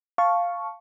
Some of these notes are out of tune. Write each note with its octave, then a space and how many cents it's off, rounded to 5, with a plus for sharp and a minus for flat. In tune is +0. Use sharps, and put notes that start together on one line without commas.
F5 +0 A5 -5 C#6 +0